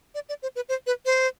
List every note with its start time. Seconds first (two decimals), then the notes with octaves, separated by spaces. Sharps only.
0.15 D5
0.29 D5
0.42 C5
0.56 B4
0.69 C5
0.87 B4
1.06 C5